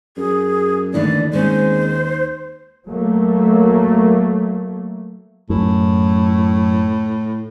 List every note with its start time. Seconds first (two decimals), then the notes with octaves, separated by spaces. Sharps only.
0.17 F#2 G#4
0.94 D#2 D3 E3 A3 D5
1.33 G#3 C4 C#4 C5
2.87 F#3 A3 A#3
5.50 F#2 A2